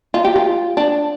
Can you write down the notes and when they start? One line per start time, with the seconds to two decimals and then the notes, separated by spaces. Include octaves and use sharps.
0.14 F4
0.25 G4
0.36 F4
0.77 D4